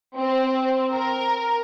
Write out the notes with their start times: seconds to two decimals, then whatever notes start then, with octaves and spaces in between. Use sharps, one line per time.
0.17 C4
0.93 A#4